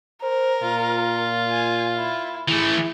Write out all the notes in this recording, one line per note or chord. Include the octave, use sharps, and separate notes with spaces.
A#4 C5
A#2 F4
G#5
E4
E3 A3 E4 G#4